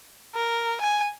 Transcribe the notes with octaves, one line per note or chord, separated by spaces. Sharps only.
A#4
G#5